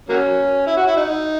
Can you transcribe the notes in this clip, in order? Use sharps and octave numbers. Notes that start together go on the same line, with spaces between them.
F#3 A#3 C#4
E4
F#4
E4
D#4